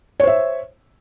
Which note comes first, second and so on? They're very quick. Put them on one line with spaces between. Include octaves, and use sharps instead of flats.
C#5 C5 E5